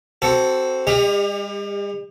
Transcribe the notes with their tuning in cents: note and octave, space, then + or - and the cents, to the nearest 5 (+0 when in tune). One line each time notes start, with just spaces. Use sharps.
C4 +0 F#4 +20 A4 +0
G3 +45 G4 +25 D#5 +0